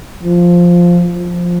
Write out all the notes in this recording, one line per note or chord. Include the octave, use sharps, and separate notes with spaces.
F3
F3